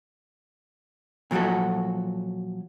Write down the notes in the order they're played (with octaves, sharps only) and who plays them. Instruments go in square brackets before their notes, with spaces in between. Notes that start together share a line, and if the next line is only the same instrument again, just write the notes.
[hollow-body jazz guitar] A#2 F3 F#3 F#4 A4